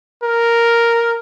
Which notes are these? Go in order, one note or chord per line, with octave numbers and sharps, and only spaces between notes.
A#4